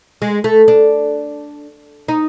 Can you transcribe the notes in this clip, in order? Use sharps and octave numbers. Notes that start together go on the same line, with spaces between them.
G#3
A3
D4
D#4